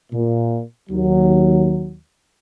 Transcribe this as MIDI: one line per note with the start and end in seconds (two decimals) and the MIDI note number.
0.12 0.61 46
0.90 1.95 39
0.90 1.95 54